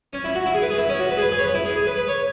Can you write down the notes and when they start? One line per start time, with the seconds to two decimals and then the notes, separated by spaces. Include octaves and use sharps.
0.13 C#4
0.24 E4
0.35 F#4
0.46 E4
0.54 G#4
0.62 B4
0.71 G#4
0.78 E4
0.89 C#4
0.99 F#4
1.11 B4
1.17 G#4
1.22 B4
1.32 G#4
1.39 C#5
1.43 B4
1.54 E4
1.65 G#4
1.76 G#4
1.87 B4
1.97 B4
2.08 C#5